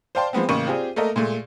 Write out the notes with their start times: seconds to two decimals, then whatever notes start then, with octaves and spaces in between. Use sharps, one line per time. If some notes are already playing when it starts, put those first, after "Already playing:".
0.15 C5 D5 F5 G5 A5 C6
0.33 F3 G#3 B3 C4
0.49 A1 C#3 A#3 C#6 D#7
0.67 C4 F4 G4 G#4 D5
0.96 A3 A#3 A4 A#4 D#5
1.16 A#2 G#3 A3